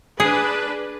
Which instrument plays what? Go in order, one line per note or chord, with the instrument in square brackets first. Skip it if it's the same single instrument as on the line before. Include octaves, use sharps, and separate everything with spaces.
[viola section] D4 B4 [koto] G#4